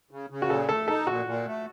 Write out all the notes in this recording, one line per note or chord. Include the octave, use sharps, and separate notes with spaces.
C#3
C#3
F#4
A#2 A4
A3 A4
D#4 A4
A#2 F#4
A#2
A3